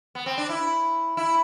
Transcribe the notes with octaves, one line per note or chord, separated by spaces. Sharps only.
B3
C4
D4
E4
E4